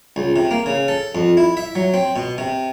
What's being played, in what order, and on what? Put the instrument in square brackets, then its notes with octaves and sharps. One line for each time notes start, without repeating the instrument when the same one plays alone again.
[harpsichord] C#2
C3
A#3
C#3
A4
F2
E4
E5
F#3
C4
B2
C3